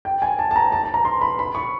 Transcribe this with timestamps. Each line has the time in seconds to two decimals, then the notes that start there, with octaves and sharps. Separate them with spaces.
0.05 G5
0.22 G#5
0.39 A5
0.51 A5
0.56 A#5
0.72 A5
0.84 A5
0.94 A#5
1.05 C6
1.21 B5
1.39 B5
1.55 C#6